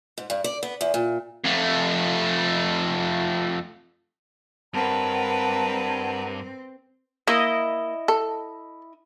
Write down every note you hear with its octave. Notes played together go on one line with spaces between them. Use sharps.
G#2
G2
D5
B3
E2
A#2
F2 A3
G2 C4 A#4 B4 F#5 A5 A#5
A#3 E4 D#5
A4